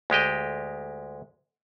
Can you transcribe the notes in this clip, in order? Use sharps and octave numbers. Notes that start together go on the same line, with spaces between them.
D2 G#3 G4 D#5